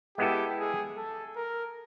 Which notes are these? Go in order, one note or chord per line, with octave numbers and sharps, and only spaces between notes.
G#3 B3 E4 G4 A4
G#4
A4
A#4